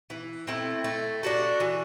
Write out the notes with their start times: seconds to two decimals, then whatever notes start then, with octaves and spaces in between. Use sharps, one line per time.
0.10 E3
0.47 A3 C4 E4
0.84 A3
1.23 D4 F#4 A4
1.60 E3